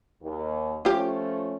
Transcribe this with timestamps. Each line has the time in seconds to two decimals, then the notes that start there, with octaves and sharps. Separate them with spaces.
0.20 D#2
0.85 F3 A3 C#4 F4 G4